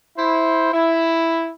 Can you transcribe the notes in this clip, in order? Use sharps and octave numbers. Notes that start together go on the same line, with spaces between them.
E4 C5
E4